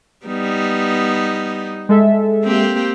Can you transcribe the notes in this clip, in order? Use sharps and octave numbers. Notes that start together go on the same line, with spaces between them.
G3 B3 D#4
G#3 A4 E5
A#3 C4 G4